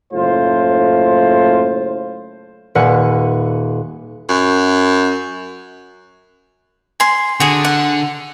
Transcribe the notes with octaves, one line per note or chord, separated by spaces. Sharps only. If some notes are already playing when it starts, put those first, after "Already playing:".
F#1 A2 F4 C5
D#1 B4 F#5 G#5 F#6
F#2
G#5 C6
D3 F#4 G#4
F#5